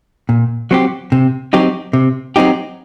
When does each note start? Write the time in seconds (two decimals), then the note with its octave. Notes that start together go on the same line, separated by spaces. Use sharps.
0.29 A#2
0.71 F#3 C4 G4
1.12 C3
1.53 F#3 C4 D#4 G4
1.93 C3
2.36 F#3 C4 D#4 G4